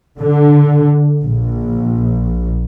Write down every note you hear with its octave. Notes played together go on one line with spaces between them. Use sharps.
D3
A#1